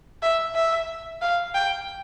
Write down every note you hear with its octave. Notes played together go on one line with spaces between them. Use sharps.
E5
E5
F5
G5